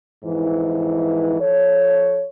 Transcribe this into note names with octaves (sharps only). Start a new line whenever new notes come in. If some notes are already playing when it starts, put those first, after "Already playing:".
F2 G#2 E3
F3 A4 C#5